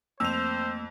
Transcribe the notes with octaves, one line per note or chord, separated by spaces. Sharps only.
F2 A3 A#3 C5 E6 F7